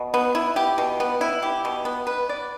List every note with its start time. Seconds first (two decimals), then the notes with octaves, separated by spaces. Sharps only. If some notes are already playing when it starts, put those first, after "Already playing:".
Already playing: B2
0.14 B3
0.35 E4
0.56 G4
0.78 B2
1.00 B3
1.21 E4
1.42 G4
1.65 B2
1.85 B3
2.07 B4
2.29 D5